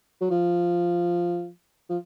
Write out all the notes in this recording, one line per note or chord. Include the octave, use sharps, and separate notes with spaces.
F#3
F3
F3